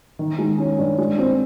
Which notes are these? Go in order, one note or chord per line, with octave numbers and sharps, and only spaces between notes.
D#3
G#3
C#4
G2
G#3
C4